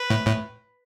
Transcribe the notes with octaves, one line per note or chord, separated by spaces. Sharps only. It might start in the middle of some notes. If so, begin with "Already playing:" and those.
Already playing: B4
A2
A2